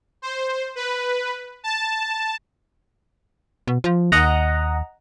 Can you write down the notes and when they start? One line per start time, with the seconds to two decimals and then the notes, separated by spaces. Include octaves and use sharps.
0.22 C5
0.76 B4
1.64 A5
3.67 B2
3.84 F3
4.12 D#2 D#5 F#5 A#5